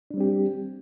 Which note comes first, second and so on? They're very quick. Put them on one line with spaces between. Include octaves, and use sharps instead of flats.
D4 G3 C4 G4